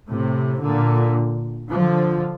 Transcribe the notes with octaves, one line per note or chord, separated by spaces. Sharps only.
A2 C3
A#2 D3
D3 F3